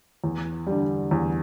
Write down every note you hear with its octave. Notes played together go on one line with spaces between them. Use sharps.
E2
D3 G3
E2